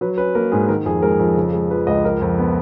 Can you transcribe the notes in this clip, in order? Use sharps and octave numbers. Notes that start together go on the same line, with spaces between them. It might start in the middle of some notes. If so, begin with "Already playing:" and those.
F#3 B4
C#4 B4
A#3 A#4
G#2 G#4
D#3 A#4
F2 G#4
G#3 A#4
F2
C#3
G#3
F3 B4
C#2 D#5
F3 A#4
F2
B3